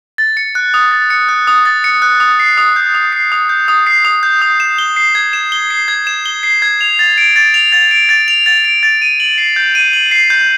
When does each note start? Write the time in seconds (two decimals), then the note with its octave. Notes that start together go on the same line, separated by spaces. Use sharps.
0.18 A6
0.37 C#7
0.55 F#6
0.74 D#6
0.92 A6
1.10 C#7
1.29 F#6
1.47 D#6
1.65 A6
1.84 C#7
2.02 F#6
2.20 D#6
2.40 C7
2.58 D#6
2.76 G6
2.94 D#6
3.13 C7
3.32 D#6
3.49 G6
3.68 D#6
3.87 C7
4.05 D#6
4.23 G6
4.42 D#6
4.60 E7
4.78 G7
4.96 C7
5.15 G#6
5.33 E7
5.52 G7
5.70 C7
5.88 G#6
6.07 E7
6.26 G7
6.43 C7
6.62 G#6
6.81 F7
6.99 A6
7.18 D7
7.36 A6
7.54 F7
7.72 A6
7.91 D7
8.09 A6
8.28 F7
8.46 A6
8.65 D7
8.83 A6
9.02 D#7
9.20 F#7
9.38 C7
9.56 G6
9.75 D#7
9.93 F#7
10.11 C7
10.30 G6